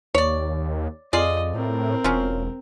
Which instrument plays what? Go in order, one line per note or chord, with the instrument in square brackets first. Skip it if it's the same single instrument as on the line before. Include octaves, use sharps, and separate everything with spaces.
[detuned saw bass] D#2 [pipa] C#5 D5
[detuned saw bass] F2 [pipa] F4 G#4 D5 [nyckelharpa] D#5
[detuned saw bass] A2 [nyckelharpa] C4 A#4
[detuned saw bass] E1 [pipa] C#4 F4